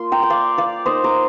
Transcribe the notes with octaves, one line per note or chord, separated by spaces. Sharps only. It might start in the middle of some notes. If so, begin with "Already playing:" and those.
Already playing: A#3 F4 C6
G5 A#5
G5
D5 F5
D5 F5
A#3 D#4 C5 D#5
A#5 D6